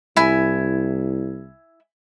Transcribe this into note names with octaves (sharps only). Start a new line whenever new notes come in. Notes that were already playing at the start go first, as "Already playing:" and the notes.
C2 E4 G#5